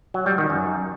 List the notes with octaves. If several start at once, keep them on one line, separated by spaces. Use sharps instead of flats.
F#3
G3
D#3
F#2